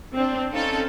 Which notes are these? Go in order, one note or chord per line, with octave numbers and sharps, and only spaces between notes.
C4 D4
C4 C#4 D#4 F4 A4